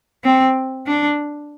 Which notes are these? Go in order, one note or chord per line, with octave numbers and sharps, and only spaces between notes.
C4
D4